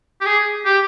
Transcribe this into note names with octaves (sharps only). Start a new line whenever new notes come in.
G4
G#4
G4